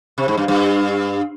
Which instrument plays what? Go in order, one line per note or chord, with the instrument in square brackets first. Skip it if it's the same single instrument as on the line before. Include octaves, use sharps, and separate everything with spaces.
[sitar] C3
G#2
G2
G2